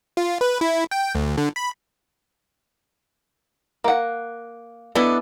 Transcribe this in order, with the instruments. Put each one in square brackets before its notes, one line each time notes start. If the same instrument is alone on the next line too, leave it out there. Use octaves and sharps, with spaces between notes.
[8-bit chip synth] F4
B4
E4
G5
D2
D3
B5
[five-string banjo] A#3 F#5
[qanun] B3 E4 D#5 [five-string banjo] D4 A4